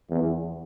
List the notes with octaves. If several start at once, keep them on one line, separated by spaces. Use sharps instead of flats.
E2